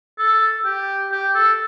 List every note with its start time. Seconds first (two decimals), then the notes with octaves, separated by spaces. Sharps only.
0.18 A4
0.65 G4
1.12 G4
1.35 A4